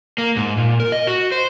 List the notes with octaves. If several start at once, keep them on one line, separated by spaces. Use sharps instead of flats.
A#3
G#2
A#2
A#4
D#5
F#4
C5